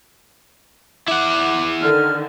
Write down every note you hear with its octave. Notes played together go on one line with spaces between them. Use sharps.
E4 F#5 D6
D3 D#3 F6